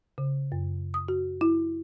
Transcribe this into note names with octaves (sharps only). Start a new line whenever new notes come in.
C#3
F#2
D#6
F#4
E4